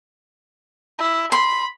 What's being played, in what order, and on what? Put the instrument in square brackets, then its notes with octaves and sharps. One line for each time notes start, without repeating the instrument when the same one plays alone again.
[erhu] E4
[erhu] B5 [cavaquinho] C6